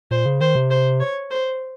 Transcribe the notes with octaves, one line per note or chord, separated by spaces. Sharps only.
A#2 C5
C#3
D#3 C5
C3
C5
C#5
C5